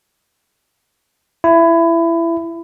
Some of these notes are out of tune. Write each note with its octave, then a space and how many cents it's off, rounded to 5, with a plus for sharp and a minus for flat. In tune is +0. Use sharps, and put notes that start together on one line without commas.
E4 +20